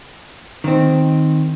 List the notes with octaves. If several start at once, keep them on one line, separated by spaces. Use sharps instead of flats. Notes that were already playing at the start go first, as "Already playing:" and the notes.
D#3 C4